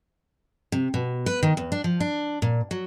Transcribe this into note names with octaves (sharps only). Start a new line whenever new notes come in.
C3
B2
B4
D#3
E2
D4
F3
D4
A#2
F#3